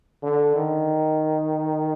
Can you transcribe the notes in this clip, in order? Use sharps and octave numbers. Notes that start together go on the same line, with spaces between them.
D3
D#3